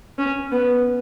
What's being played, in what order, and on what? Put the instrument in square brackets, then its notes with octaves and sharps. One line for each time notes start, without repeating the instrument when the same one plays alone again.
[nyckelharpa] C#4
B3